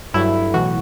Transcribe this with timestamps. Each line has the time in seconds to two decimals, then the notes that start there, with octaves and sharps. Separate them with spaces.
0.14 G2 F#3 A3 E4
0.54 B1 A2 E3 F#4